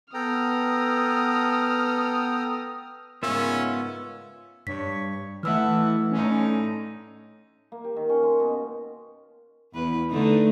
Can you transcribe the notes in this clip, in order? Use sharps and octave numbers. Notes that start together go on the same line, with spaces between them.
B3 A4 G5 A#5 D#6 F6
G#2 C#3 B3 C#4 F4 A#4 E5 E6
G2 C#5 B6
E3 A3 E5 F#5 A5 E6 F6
A2 D3 C#4 D#4
A#3
G4
D#3
C#4
C6
B2
E2 B4
D3 A3 D#4